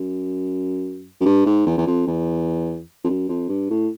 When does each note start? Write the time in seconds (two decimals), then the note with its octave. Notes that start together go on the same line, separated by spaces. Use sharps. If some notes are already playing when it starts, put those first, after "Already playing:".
Already playing: F#2
1.20 F#2
1.25 G2
1.46 G#2
1.66 E2
1.78 E2
1.87 F2
2.07 E2
3.04 F2
3.09 F#2
3.29 F2
3.49 G2
3.70 A2